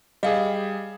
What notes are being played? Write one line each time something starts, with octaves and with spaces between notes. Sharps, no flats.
G3 G#4 D#5 F5